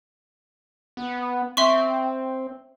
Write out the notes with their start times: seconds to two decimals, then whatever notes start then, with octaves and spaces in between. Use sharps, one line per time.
0.97 B3
1.57 C4 E5 C6 C#6